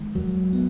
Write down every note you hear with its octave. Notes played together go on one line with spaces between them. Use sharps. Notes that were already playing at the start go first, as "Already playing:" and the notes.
Already playing: D#3 G#3
D#2 F#3
B3